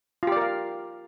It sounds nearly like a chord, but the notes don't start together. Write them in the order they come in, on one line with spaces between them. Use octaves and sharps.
F4 G4 D5 A#4 F5